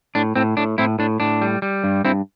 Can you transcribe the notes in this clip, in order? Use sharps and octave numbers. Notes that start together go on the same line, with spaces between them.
A2 D4
A2 C4
A2 D4
A2 C4 E4
A2 D4
A2 D4
G3
G3
G2
G2 C4 E4